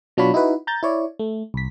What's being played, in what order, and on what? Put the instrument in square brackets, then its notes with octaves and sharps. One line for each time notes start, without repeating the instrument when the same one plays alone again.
[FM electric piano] B2 F#3 D4 F4 C#5 B5
D#4 E4 F#4 B4
A#5 G6 A6
E4 C#5 D5
A3
C2 B6